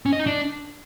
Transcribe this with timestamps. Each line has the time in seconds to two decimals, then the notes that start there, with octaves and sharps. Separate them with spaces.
0.06 C#4
0.13 D#5
0.19 D#4
0.26 D4